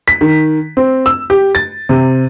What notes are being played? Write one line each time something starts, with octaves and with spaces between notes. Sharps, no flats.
B6
D#3
C4
E6
G4
A6
C3